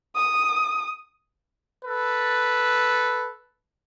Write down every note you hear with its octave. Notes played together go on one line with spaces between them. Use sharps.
D#6
A4 B4